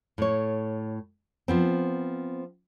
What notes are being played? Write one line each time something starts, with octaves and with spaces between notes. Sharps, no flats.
A2 C#5
F3 B3 C4